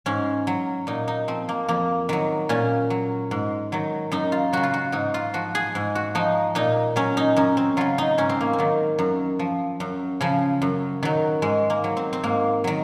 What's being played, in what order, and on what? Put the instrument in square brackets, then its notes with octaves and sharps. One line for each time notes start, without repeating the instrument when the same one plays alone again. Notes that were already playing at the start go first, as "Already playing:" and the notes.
[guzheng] G#2 C#4
F#3
A#2 D#4
D#4
F3 C4
A#3
F2 A#3
D#3 F#3
A#2 C#4
F#3
G#2
D#3 F#3
F#2 D#4
F4
C#3 F#3 F#4
F4
F#4
G#2 D#4
F4
F3 F#4
G#4
G#2
F#4
F3 D#4
A#2 D#4
F#3 C#4
D#4
F#2 C#4
C4
C#3 F#3 F4
D#4
G#2 C#4
C4
A#3
C4
D#3 F#3
F#2
F3
F#2
C#3 F3
F#2
D#3 F#3
G#2 G#3
A#3
F#3
C4
C4
G#2 A#3
D#3 F#3